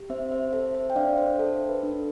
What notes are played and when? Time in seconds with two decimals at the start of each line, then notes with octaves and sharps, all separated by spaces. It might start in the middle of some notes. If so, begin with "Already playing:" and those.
Already playing: G4
0.10 C4 C5 E5
0.31 C5 E5
0.53 A4 C5 E5
0.74 C5 E5
0.90 G5
0.96 D4 D5 F5
1.18 C5 E5
1.39 A4 C5
1.69 B4
1.83 D4